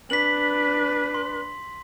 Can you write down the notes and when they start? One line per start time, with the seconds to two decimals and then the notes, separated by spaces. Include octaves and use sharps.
0.10 D4 B4 B6 F#7
1.14 C6